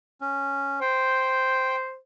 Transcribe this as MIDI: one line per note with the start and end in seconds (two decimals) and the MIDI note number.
0.21 0.80 61
0.81 1.97 72
0.81 1.76 79